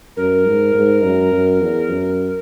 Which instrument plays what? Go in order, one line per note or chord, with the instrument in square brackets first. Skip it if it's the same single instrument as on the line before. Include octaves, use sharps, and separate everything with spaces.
[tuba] F#2 [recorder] A#4
[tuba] G#2
G#2
F#2
F#2
E2
F#2